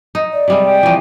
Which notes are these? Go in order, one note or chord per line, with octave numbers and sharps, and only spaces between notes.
D#4
D5
C3 G3 G#3
G5
E3 F3